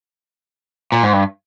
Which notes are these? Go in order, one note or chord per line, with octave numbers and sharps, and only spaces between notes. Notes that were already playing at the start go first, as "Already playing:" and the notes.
A#2
G#2
G2